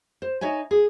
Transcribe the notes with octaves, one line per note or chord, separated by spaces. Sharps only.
C5
D#4 C#5 E5 G#5
G#4